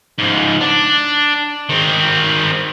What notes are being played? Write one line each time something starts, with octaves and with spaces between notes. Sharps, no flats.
G#2 F3
D4
D#3 C4